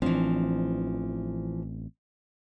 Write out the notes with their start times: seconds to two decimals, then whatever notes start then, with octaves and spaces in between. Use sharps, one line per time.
0.02 A1 E3 F3 C4 D4